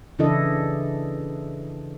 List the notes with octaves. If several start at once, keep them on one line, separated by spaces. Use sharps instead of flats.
C#3 E3 D4 E4 A4 D#5